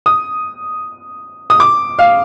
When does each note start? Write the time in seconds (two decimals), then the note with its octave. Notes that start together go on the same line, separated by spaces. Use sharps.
0.06 D#6
1.50 D#6
1.60 D6
1.99 F5